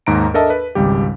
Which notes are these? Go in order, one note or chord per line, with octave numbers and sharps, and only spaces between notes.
D#2 G#2 A#5 D7
D4 A4 A#4 D#5 E5 A5
B4
G#1 C#2 G3 G4